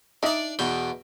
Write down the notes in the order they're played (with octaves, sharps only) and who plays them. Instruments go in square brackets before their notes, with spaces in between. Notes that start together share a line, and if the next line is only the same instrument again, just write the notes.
[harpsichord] D4 D5 [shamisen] D#4 E5
[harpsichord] E2 B2 G5